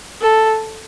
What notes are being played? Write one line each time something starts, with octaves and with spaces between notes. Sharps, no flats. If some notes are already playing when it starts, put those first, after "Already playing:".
A4